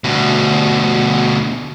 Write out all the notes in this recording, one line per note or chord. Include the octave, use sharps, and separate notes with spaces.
D2 B2